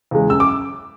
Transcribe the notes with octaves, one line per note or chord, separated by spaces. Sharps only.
E2 C#3 G#3
F#2 E6
D6